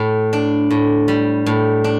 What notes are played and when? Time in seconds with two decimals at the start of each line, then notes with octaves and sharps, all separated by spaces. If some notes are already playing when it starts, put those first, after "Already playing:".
Already playing: A2
0.33 D4
0.70 A2
1.08 G3
1.46 A2
1.84 D4